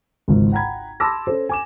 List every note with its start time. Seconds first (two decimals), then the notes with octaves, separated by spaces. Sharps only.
0.28 G#1 C#2 G#2
0.52 F#5 G5 A#5 B5 G#6
1.00 A5 B5 C6 D6 E6 A#6
1.27 C#4 A4 C5
1.49 G#5 D6 E7